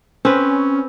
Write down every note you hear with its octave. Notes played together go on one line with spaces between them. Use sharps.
C4 C#4 B4